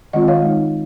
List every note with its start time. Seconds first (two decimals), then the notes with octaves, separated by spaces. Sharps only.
0.13 D#3 G#3 C4 F4 D#5 F#5
0.28 C#5 F5
0.42 G#3 D#4